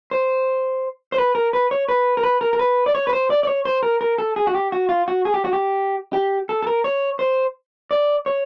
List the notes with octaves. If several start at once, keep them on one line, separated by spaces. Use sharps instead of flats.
C5
C5
B4
A#4
B4
C#5
B4
A#4
B4
A#4
A#4
B4
D5
C#5
B4
C5
D5
D5
C#5
C5
A#4
A#4
A4
G#4
F#4
G4
F#4
F4
F#4
G#4
G4
F#4
G4
G4
A4
A4
A#4
C#5
C5
D5
C#5